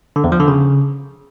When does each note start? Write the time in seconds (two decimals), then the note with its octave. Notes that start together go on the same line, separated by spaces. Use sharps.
0.16 D3
0.24 E2
0.32 F3
0.40 D3
0.48 C#3